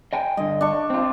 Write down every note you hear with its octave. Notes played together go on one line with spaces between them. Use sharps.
D#5 G5 G#5
G2 D3 D#5
D4 C#6
C4 F4